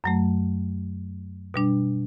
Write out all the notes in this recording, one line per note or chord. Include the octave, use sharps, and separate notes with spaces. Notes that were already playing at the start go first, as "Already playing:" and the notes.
F#2 F#3 A3
B2 G3 D4